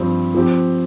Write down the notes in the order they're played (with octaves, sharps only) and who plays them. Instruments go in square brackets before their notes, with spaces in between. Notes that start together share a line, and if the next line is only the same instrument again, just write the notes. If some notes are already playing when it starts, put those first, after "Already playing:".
Already playing: [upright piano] G2 F3 C4 G4 C5
F3 C4 G4